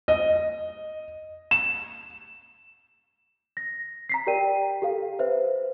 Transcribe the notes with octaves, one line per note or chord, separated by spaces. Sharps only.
D#5
E7
A#6
A#5 B6 C7
G4 A#4 D5 G5 D#7
G4 A4 F5
B4 C5 E5